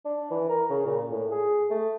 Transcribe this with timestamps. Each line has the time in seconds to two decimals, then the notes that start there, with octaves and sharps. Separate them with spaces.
0.05 D4
0.31 E3
0.49 A#4
0.70 C#3
0.86 A#2
1.11 A2
1.31 G#4
1.70 A3